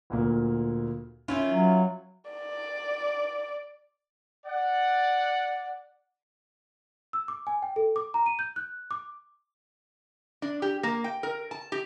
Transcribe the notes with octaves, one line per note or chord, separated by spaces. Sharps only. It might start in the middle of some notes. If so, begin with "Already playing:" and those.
D2 A#2 A#3
D#3 C#4 E4 F4
F#3
D5
D5 F#5
E6
D6
G#5
G5
A4
D6
A#5
D#7
G6
F#6
D6
D4
G4
A#3
G5
A#4
A5
G4